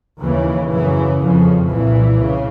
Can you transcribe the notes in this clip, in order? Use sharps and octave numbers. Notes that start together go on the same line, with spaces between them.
D#2 C#3 E3
F#2 C#3 E3
F2 C#3 F3
C2 A#2 E3
C#3